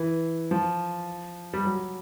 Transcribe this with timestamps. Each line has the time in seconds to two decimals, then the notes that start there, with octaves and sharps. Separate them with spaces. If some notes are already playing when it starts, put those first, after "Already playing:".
Already playing: E3
0.51 F3
1.53 G3
1.65 F#3